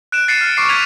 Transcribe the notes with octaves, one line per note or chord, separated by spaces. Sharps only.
F#6 D7 E7
A6 C7 C#7 D#7
F6
C#6 D6 C7 D7
G#6 B6 D#7 F7